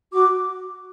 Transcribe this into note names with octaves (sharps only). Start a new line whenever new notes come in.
F#4 D6